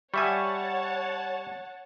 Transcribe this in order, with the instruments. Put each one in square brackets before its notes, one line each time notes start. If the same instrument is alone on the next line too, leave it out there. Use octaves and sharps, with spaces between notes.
[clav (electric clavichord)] G3 E5 G#5 [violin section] C#5 F#5 A5 [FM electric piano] C#6